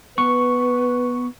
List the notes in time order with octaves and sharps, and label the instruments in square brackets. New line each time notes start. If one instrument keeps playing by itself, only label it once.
[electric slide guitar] B3 [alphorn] B4 [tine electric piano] C#6